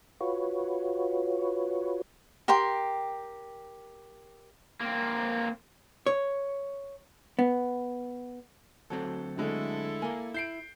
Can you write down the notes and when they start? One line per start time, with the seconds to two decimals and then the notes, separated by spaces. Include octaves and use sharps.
0.21 F4 F#4 B4 C#5
2.48 G4 A#4 G5 C6
4.81 A#3 C4
6.06 C#5
7.39 B3
8.90 D2 F#3 C4 A4
9.38 D3 G#3 A3 E4 A4
10.02 A#3 A#4 G#5
10.34 E4 G6 C7 D7